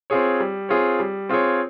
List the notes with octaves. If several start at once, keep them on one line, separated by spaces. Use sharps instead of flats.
C4 F4 G#4 C#5
G3
C4 F4 G#4 C#5
G3
C4 F4 G#4 C#5